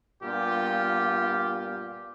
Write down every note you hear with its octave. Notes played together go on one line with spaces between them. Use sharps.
G2 A#2 B3 F4 G4